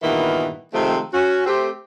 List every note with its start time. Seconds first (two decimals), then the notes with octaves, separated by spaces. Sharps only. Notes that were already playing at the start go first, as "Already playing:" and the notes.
0.03 G2 A#2 D#3 E3 A#3 B3
0.74 C3 D#3 F3 G#3 A3 C4
1.14 C#4 F#4
1.46 A3 C4 G4